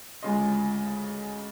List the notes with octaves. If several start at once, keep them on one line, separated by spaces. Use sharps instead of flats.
D2 C#3 G#3 F4 D#5 C6